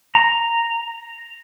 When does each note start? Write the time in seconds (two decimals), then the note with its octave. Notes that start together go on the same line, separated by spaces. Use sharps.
0.15 A#5